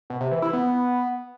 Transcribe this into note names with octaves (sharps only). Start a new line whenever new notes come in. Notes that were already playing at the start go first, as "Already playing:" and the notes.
B2
C3
E3
E4
B3